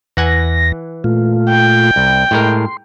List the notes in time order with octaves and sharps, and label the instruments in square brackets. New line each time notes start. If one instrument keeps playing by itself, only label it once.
[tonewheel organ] E2 A#6 [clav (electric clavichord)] E3 F#5 G#5
[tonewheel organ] A#2 A3 F4
[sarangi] G5
[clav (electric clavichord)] C2
[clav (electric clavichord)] A2 G#3 A#4 [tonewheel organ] C6